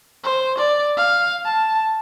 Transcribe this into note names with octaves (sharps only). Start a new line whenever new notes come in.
C5
D5
F5
A5